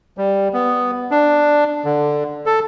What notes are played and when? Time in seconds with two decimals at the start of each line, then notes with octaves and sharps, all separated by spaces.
0.18 G3
0.53 B3
1.11 D4
1.85 D3
2.46 A4